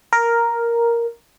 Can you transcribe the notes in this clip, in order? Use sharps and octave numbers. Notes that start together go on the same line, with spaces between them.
A#4